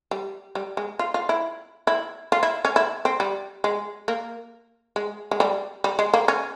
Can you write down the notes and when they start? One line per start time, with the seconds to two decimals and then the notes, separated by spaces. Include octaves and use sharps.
0.11 G3
0.55 G3
0.77 G#3
0.99 F4
1.14 F4
1.29 E4
1.87 E4
2.32 F4
2.43 E4
2.65 C#4
2.76 E4
3.05 C4
3.20 G3
3.64 G#3
4.08 A#3
4.96 G#3
5.31 G#3
5.40 G3
5.84 G3
5.99 G#3
6.14 A#3
6.28 C#4